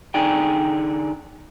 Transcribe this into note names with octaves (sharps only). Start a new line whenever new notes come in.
D3 D#4 G#4 D5 G5